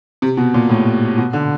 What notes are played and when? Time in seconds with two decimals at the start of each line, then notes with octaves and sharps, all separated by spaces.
0.22 C3
0.37 B2
0.54 A#2
0.69 A2
1.18 B2
1.33 D3